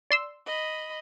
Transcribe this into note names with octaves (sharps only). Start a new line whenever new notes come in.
D5 C6 E6
D#5 B5